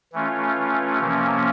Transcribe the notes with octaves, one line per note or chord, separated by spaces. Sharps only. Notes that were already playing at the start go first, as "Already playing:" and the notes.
E3 A3 C#4 F4
C3 F3 A#3 C#4